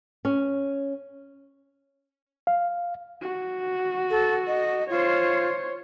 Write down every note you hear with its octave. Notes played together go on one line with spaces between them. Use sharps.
C#4
F5
F#4
A4
D#5
F4 C5 C#5